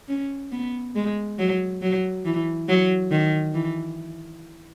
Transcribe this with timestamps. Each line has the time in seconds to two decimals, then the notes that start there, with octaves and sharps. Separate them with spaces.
0.08 C#4
0.52 B3
0.95 G#3
1.39 F#3
1.82 F#3
2.25 E3
2.69 F#3
3.11 D#3
3.54 E3